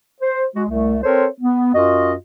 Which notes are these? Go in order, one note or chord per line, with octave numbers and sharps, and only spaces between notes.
C5
G#3 F#4
C2 A3
C4 A4 A#4 C5 C#5
B3
F#2 F4 F#4 D#5